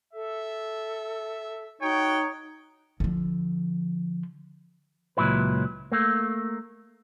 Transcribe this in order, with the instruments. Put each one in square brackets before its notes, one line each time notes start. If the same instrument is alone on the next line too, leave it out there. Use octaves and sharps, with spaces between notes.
[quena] A4 [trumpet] E5
[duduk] D#4 [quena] F#4 [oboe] C#5 [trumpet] G5
[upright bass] D3 F3
[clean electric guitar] C#2 A#2 C#3 F#3 E4 B4
A3 A#3